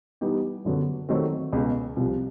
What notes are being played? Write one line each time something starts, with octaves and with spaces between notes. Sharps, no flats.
E3 G3 B3 D#4 G4
F#2 D3 F#3 B3
D#3 F#3 A3 C4
C#2 B2 G#3
C2 C3 F3